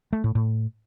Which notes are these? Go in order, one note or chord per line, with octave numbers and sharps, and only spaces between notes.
A3
A2
A2